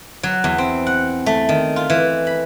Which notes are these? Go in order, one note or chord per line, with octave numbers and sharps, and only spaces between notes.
F#3
E2
C4
F#5
A3
D#3
F4
E3
B5